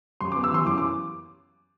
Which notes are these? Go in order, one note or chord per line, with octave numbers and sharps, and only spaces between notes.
F#2 C6
B3 D6
E6
E3 C6
F#2 D6
D6